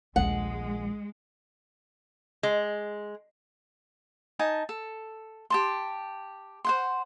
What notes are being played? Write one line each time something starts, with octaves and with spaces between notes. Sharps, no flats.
A#1 D#2 G#3 F#5
G#3
D#4 G#5 A5
A4
G4 A5 C6
C5 F#5 C6